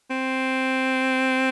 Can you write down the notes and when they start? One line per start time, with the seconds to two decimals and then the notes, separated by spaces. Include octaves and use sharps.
0.10 C4